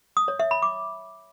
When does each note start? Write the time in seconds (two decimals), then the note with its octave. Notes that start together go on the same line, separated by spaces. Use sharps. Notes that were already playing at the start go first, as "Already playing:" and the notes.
0.17 D#6
0.28 C#5
0.40 E5
0.51 B5
0.62 D6